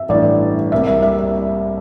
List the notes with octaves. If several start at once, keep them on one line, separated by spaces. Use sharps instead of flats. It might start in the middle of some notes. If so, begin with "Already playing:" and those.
Already playing: E5
A1 G2 E3 D5
C2 C3 G3 A#3 E5
E5
E5